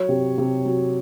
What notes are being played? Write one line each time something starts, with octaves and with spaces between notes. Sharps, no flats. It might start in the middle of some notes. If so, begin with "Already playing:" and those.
Already playing: F#3 C#5
C3
C3
F#3